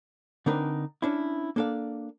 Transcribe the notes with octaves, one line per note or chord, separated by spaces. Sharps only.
D3 C4 D4 D#4 A#4 B4
C#4 D4 E4
A#3 D4 A4 D5 F5